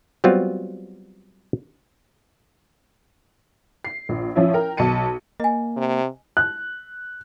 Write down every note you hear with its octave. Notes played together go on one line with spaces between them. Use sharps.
F#3 G3 B3 C4 F4
C7
A#1
F3 C#4 E4
A#4 G5
B1 A5 C#7 D#7
A#3 D#5 G#5
C3
F#6